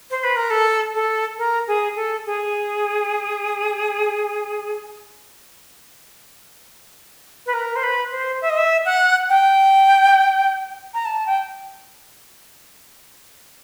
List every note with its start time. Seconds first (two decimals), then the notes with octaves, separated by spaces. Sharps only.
0.11 C5
0.24 B4
0.36 A#4
0.50 A4
0.94 A4
1.38 A#4
1.67 G#4
1.96 A4
2.26 G#4
7.46 B4
7.53 A#4
7.76 C5
7.83 B4
8.12 C5
8.41 E5
8.50 D#5
8.57 E5
8.85 F#5
9.29 G5
10.94 A#5
11.05 A5
11.26 G5